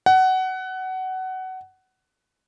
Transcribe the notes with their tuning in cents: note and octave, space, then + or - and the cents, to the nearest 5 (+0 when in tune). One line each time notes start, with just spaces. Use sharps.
F#5 +20